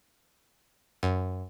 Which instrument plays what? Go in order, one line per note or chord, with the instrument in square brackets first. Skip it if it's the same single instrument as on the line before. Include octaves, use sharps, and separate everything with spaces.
[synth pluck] F#2